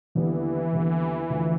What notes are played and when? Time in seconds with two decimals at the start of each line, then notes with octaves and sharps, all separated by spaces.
0.15 D#2 D3 E3 G3 B3
0.72 D#2 D3 G3 B3
1.30 D2 D3 F3